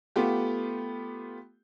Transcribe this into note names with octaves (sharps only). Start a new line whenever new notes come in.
A3 B3 F4 G4